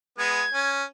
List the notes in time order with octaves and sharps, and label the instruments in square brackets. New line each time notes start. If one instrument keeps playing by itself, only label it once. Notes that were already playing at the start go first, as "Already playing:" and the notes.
[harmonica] G#3 B3 [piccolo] G#6
[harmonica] C#4